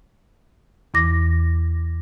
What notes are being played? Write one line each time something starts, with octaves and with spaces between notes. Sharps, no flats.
E2 E3 D6 A#6